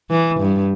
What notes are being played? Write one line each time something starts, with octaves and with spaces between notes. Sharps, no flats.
E3
G2